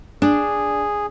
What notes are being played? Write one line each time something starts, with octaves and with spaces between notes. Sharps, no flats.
D4 G#4